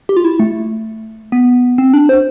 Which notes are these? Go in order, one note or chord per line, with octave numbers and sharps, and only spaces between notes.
G4
F4
E4
A3
B3
C4
D4
C5